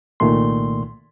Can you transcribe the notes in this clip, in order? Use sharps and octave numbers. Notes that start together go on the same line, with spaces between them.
C2 A#2 D#3 A3 C6